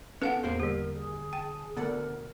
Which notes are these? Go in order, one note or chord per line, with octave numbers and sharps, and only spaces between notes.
B3 C#4 A4 B4 F5 F#5
E2 A2 A#3 G#4 A#4 C5
D3 G3 G4 A#4
G#4
G5 A5
D2 B2 A4 A#4 D5 F#5